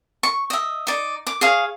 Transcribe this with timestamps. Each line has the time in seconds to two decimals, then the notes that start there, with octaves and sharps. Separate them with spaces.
0.23 C#6
0.50 D#5 E5
0.87 D#4 D5
1.27 D6
1.41 G#4 C#5 F5